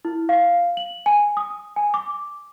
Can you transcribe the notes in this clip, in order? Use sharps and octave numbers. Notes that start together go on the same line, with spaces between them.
E4
F5
F#7
G#5
D#6
G#5
D6